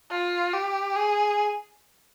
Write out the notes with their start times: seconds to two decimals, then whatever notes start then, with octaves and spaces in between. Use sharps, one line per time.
0.11 F4
0.53 G4
0.96 G#4